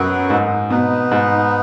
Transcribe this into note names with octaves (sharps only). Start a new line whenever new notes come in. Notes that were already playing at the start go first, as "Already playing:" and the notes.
Already playing: F#2 F#3 B3 F#4 B4
G#2
B2 B3 D#4 B4
G#2